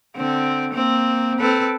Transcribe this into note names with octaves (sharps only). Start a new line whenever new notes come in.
D3 C4
A#3 C4
C4 A4 B4